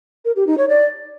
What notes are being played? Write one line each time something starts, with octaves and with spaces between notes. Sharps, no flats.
A#4
G4
D#4
C#5
D5